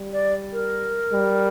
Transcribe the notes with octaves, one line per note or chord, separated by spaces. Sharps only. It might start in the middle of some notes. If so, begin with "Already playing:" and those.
Already playing: G3
D5
A#4
G3